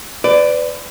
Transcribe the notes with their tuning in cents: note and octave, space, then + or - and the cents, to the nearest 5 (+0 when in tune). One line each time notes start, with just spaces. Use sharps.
B4 +35 D5 +0